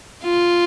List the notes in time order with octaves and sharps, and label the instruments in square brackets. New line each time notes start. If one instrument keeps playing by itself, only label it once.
[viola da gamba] F4